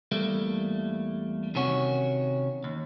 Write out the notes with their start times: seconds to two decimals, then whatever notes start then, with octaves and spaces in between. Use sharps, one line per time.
0.12 E2 G3 A3 A#3
1.55 C3 D#3 C#4 F#4
2.64 D#2